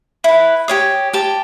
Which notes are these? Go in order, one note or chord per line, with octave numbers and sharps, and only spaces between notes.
E4 B4
G4 C#5 D#6
G4 A5